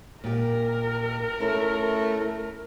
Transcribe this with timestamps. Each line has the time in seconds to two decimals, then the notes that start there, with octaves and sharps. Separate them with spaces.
0.24 A#2 G4 A#4
1.41 A3 C#4 E4